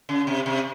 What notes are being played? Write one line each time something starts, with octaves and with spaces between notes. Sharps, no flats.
C#3
C3
C3